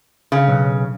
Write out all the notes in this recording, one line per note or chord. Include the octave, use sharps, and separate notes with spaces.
C#3
B1